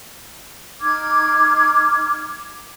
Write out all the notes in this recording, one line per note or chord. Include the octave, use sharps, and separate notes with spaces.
D#4 D6 F6 G#6